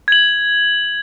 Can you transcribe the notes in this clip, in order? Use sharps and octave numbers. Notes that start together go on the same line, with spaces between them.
G#6 F#7